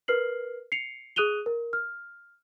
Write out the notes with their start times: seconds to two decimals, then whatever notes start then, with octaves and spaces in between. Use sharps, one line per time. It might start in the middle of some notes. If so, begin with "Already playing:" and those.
0.08 A#4 B4 F6 C7 F#7
0.72 C7 C#7 F7
1.16 G#4 D#6 F#6 D#7 F7 G7
1.46 A#4
1.73 F6